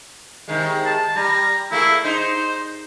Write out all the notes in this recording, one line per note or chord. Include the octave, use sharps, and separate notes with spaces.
C3 D#3 G#3
A5
G3 A#5
A3 A#3 E4 G#4
D#4 C5